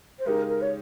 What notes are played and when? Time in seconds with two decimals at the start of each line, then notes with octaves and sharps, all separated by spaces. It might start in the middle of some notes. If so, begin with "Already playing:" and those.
0.19 C5
0.25 C#3 G#3 D#4 G4 A#4
0.48 A#4
0.61 C#5